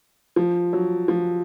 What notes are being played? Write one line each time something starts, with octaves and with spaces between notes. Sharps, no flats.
F3
F#3
F3